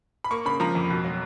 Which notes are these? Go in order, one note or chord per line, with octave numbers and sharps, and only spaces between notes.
B5
A#3 C#6
C#3 B5
F3 A#5
F2
B2
F#3